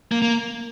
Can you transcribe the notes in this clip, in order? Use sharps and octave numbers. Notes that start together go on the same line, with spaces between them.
A#3
A#3